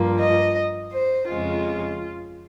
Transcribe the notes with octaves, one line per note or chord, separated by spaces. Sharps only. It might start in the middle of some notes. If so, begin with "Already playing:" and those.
Already playing: G2 F3 A#3
D#5
C5
F2 C#3 G#3 F4